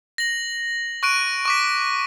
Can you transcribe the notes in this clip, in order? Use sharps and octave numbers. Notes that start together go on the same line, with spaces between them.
A#6 F#7
C#6 F#6 D7 D#7
C#6 D6 B6